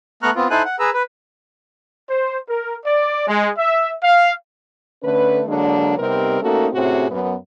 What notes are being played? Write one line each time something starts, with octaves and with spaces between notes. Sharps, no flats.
A3 B3 A#5 C#6 F6 F#6
B3 C4 F4
D#4 E4 A4 C5 G#5 F#6
F#5
G#4 B4 A#5 E6
B4
C5
A#4
D5
G#3
E5
F5
D3 A3 C#4 B4
D3 F#3 G#3 A#3 D4
C3 G3 B3 C4 D#4 A#4
A3 A#3 C#4 D#4 F#4 A4
A2 C3 C4 C#4 F#4 G#4
F#2 B3